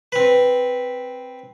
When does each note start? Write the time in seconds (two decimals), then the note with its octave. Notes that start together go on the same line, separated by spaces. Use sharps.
0.12 C4 B4